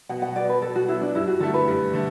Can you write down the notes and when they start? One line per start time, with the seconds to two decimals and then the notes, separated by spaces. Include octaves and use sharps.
0.09 B2 F#5
0.22 F#5
0.36 F#3 B3 D5
0.49 B4
0.62 B2 A4
0.75 F#4
0.88 F#3 B3 E4
1.01 D4
1.15 G2 E4
1.27 F#4
1.40 D3 A3 E4 A4
1.54 B4
1.68 G2
1.93 D3 A3